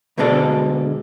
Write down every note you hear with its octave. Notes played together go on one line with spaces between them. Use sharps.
D2 B2 D3 G#3 A4 D5